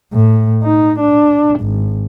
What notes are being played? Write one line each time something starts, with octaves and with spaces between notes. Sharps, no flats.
A2
D#4
D4
G#1